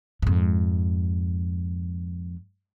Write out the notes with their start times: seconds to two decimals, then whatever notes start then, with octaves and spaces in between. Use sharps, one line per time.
0.22 F2 G#2